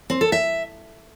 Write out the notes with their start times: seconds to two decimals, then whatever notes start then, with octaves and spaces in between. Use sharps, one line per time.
0.10 C4
0.21 A4
0.32 E5